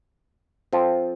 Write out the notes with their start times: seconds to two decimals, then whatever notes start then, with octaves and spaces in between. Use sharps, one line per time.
0.73 F3 C4 F4 A4